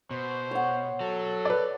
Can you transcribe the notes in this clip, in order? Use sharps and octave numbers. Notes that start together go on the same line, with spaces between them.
B2 C5
C#5 F#5
F#3 A4
B4 D5